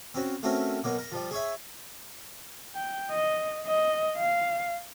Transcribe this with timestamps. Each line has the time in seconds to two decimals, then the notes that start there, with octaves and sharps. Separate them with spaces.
0.14 C4 C#4 F#4
0.43 A3 C4 C#4 F#4 A#4
0.84 B2 F#3 A#3
0.98 A#4
1.12 F3 G3
1.31 G#4 C#5 E5
2.75 G5
3.11 D#5
3.67 D#5
4.18 F5